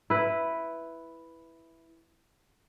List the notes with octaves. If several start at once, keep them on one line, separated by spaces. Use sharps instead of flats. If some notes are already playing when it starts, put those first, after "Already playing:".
E4 B4